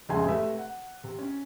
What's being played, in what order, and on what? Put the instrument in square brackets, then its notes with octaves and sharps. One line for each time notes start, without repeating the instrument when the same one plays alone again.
[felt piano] F1 C#3 G#3 E5 G#5 C6
C3 A3 B4 E5
F#5
C3
C#4